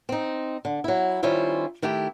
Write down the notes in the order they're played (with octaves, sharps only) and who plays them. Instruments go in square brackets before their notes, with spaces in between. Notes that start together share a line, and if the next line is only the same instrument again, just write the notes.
[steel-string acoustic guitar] C4 D#4
D3
F#3 E4
D#3 G3 C#4 E4 F4 C5
D#3 A3 E4 G4